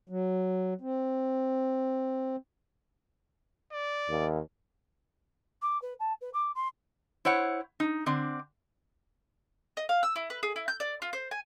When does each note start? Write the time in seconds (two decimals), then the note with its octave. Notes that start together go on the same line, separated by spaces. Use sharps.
0.09 F#3
0.81 C4
3.72 D5
4.10 D#2
5.62 D6
5.82 B4
5.99 A5
6.21 B4
6.33 D6
6.55 C6
7.25 E4 C5 C#5 F#5
7.80 D#4
8.06 D3 C4 D4
9.77 D#5
9.89 F5
10.03 E6
10.16 E4
10.30 B4
10.43 G#4
10.56 E4
10.68 G6
10.80 D5
11.02 F4
11.13 C5
11.31 G#5